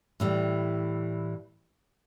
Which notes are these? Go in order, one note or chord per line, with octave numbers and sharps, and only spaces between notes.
A2 E3 G3